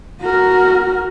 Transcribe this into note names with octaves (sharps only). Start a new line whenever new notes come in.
F#4 A#4